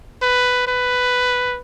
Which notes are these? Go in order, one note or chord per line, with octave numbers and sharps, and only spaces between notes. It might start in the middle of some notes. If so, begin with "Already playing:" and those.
B4
B4